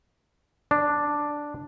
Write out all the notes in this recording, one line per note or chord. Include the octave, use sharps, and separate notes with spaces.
D4